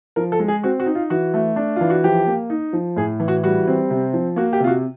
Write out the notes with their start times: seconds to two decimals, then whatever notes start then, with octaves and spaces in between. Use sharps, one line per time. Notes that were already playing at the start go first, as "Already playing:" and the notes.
0.16 F3 A#4
0.32 A4
0.40 G#3
0.48 G#4
0.64 C4 F#4
0.80 F#4
0.86 D#4
0.95 F4
1.10 E3 F#4
1.34 A3
1.56 D4
1.76 E3 F4
1.90 F#4
2.04 F3 G4
2.27 A#3
2.50 D#4
2.73 F3
2.96 A2 G#4
3.20 E3
3.28 F#4
3.44 G3 F#4
3.68 C4
3.90 C3
4.13 F3
4.36 A#3 F#4
4.53 G4
4.60 C3 F4
4.68 F#4